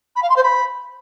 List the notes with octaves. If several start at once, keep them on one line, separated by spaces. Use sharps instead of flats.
B5
F5
C6
C5
B5